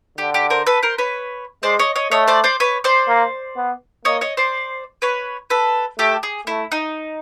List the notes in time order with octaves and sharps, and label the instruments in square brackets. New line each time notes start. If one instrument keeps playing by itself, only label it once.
[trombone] D3 [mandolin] G4
[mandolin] G4
A#4 C5
A4 B4
A#4 C5
B4 C#5
[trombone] G#3 [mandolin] C5 D5
[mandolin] C#5 D#5
C#5 D#5
[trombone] A3 [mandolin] C#5 D#5
[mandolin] C5 D5
C5 D5
B4 C#5
C5 D5
[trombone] A#3
B3
[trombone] A#3 [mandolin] C#5 D#5
[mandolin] C#5 D#5
C5 D5
B4 C#5
A4 B4
[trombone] A3 [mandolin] G4 A4
[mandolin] G#4
[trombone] A3 [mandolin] E4
[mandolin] D#4